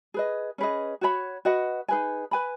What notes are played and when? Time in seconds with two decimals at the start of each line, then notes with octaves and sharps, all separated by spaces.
0.14 G#4 B4 D#5
0.58 C#4 G#4 B4 D#5
1.01 F#4 C#5 G#5 B5
1.45 F#4 B4 D#5 F#5
1.88 D#4 G#4 B4 G#5
2.31 B4 G#5 B5